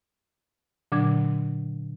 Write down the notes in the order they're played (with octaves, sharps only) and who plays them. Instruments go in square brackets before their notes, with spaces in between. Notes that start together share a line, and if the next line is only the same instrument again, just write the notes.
[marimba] A#2 D3 F#3 D4 D6 G#6